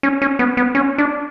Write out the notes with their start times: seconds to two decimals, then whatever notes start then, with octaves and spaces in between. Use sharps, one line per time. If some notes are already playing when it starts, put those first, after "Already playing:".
0.03 C#4
0.22 C#4
0.39 B3
0.57 B3
0.75 C#4
0.98 D4